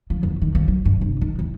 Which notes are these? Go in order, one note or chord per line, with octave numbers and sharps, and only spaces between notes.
F3
E2
D#3
F2
F#3
G2
F1
D#3
E2